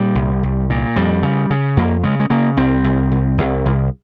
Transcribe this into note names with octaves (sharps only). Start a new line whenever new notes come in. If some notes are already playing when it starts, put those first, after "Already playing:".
Already playing: A#2 G3
C2
C2
A#2
F2 G3
C#3
C#3
F2 A#3
C#3 G#3
G#3
C#3 A#3
C2 C4
C2
C2
C2
C2